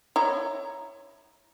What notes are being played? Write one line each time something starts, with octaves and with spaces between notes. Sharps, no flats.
E4 C#5 A#5